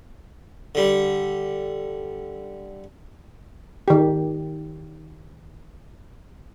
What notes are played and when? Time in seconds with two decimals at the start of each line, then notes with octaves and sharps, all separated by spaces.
0.75 D3 G3
3.88 D#3 G4